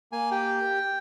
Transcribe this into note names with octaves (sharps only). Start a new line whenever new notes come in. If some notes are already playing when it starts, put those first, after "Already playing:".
A#3 G#5
G4 G5